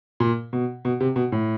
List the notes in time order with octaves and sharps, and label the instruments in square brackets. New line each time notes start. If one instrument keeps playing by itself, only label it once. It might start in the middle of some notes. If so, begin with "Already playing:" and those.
[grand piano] A#2
B2
B2
C3
B2
A2